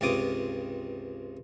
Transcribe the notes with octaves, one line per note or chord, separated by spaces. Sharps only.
C#2 G2 C3 F4 D6 D#6